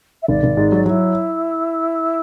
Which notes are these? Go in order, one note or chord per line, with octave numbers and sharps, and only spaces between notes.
E5
G#1 D5
G#1
G#2
F#3
F#3 E4